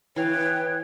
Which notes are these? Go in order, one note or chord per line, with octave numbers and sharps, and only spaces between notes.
E3 B4 C#5 F5 G5